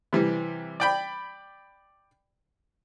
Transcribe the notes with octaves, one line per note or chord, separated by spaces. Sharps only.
C3 E3 G3
D5 G5 B5